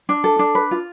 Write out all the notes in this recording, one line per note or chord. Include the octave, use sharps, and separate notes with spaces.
D4
A4
D4
B4
F4